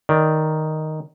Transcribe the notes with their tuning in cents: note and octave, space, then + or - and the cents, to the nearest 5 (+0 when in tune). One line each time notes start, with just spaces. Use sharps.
D#3 +0 D5 +0